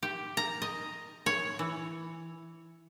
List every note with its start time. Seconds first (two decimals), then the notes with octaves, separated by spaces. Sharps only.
0.03 G4
0.37 A#5
0.62 D#5
1.26 C#5
1.59 E3